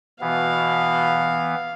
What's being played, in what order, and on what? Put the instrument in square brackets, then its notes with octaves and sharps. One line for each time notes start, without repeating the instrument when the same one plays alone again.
[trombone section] B2 [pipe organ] E3 B3 [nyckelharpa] F5